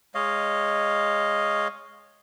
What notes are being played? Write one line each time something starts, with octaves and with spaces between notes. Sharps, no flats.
G#3 C#5 D#5 F5